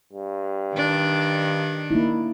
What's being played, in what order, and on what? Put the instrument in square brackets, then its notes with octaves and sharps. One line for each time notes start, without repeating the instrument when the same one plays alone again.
[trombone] G2
[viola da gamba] D#3 D4
[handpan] A#3 D#4 E4